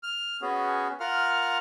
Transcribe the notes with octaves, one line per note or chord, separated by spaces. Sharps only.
F6
B3 C#4 F#4 G#4
F4 A#4 F5 F#5 F6